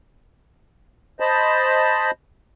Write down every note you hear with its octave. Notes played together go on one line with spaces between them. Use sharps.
C5 D#5 A5 B5